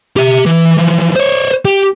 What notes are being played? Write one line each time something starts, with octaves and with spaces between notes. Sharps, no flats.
G4 E5
E3
E3 F3
C5 C#5
G4